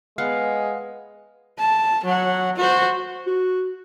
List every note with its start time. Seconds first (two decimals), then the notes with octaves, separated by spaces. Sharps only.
0.18 G#3 B3 F5 F#5
1.58 A5
2.04 F#3 F#5
2.56 F#4 C5
3.27 F#4